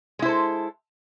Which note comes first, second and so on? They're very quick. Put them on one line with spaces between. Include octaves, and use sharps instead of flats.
G#3 E4 C5 A4